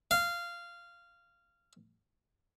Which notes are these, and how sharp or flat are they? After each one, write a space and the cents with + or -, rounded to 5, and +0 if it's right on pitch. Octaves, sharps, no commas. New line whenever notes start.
F5 -15